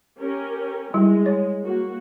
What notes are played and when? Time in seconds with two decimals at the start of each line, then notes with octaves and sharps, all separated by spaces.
0.20 C#4 G4 A#4
0.94 G3 G#3 E4
1.26 C#5
1.63 A#3 F#4